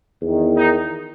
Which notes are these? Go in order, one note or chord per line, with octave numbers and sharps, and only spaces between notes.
E2 D#3
D#4